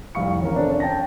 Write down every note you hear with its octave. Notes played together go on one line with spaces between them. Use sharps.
F1 C2 F5 C#6 C#7
E3 C#4 E4 A#4
C4 D4 A4 D5
C#4 D4
G5 A5 A#6